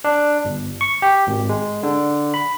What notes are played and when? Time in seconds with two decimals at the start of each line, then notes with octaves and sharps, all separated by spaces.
0.04 D4
0.45 G1
0.81 C#6
1.02 G4
1.27 G#1
1.49 G#3
1.83 D3
2.34 B5